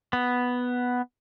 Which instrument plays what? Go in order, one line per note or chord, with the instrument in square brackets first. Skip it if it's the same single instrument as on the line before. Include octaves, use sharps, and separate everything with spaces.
[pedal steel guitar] B3